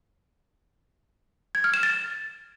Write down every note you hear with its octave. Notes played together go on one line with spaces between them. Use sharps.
G#6
F6
E7
A6